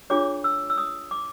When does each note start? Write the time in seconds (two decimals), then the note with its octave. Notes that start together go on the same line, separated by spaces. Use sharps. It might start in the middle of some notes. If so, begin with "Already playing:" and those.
0.10 D4 F4 G#4 C#5 D6
0.44 E6
0.70 E6
0.78 D#6
1.11 D6